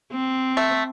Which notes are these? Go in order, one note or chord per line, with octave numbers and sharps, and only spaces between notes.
C4
A3